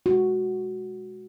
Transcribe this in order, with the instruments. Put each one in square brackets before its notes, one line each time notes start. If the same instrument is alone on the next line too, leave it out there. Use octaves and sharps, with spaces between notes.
[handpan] B2 G#3 F#4